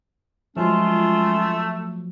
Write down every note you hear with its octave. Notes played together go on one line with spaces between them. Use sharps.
F3 F#3 G#3 A3 C#4 F4